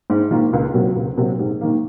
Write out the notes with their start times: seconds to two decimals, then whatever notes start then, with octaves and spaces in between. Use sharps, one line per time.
0.10 G#2
0.31 D#3 A#3 F4
0.53 C#2
0.74 C3 F#3
0.96 C#2
1.18 C3 F#3
1.39 G#2
1.61 D#3 A#3